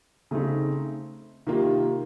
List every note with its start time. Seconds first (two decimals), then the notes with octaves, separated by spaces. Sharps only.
0.31 C#3 A3 C4 D#4
1.47 C3 D#3 A#3 F4